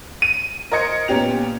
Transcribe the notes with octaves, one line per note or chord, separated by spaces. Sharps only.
D#7
A#4 C5 D#5 G#6 C#7
A#2 B3 C#4 G4 F7